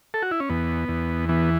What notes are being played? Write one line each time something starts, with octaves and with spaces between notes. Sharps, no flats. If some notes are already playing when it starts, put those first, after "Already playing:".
A4
F#4
E4
C#4
E2 B3
E2
E3 B3